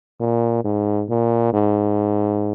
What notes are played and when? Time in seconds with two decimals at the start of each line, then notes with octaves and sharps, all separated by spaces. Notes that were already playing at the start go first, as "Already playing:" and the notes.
0.20 A#2
0.64 G#2
1.10 A#2
1.54 G#2